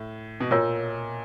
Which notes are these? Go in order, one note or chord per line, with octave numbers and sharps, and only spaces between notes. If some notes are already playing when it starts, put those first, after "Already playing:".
Already playing: A2
B2
A#2 F4 A#4 C#5